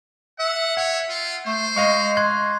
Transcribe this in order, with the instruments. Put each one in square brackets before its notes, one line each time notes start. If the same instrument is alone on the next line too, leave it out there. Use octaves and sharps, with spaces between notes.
[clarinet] E5 [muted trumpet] F#5
[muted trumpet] C#5 [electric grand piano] F#5
[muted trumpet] F4
[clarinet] A3 [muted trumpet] C5
[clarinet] G#3 [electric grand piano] D#5 F5 C#6
[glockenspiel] C6 F#6 G#6